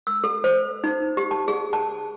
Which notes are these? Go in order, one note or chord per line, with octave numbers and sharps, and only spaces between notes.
E6
A4
C5
D#4
G4
A5
G#4
A5